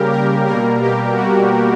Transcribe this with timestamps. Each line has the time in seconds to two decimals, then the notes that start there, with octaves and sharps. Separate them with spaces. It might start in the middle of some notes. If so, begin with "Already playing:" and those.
Already playing: C#3 G3 A#3 G4 A#4
0.12 A#4
0.47 B2 G3 A#3 A#4
0.82 G4
1.16 F#4